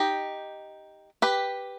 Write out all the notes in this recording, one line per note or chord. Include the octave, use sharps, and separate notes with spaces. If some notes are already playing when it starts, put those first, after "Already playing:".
Already playing: D#4 G4
G4 B4